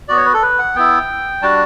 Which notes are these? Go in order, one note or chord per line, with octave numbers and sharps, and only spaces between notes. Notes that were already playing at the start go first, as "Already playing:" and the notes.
B3 F#4 D5
C#5
B4
A4
B4
F#5
B3 E4 G5
G3 D4 F#4 A5